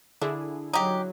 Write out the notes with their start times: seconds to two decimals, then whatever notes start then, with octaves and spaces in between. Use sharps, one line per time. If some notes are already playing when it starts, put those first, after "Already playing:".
0.21 D3 D4 E4 G#4
0.73 F#3 D#4 G4